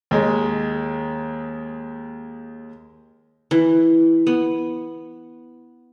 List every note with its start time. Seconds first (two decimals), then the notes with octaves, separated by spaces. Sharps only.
0.11 D#2 G#3
3.51 E3
4.27 B3